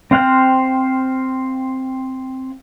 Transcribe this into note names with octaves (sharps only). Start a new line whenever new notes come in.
C4 C5 F5 G5 F#6